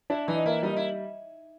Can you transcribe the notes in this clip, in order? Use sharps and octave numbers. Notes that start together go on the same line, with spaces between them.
D4 E4
E3 D#4
A#3 E4
G3 D#4
E4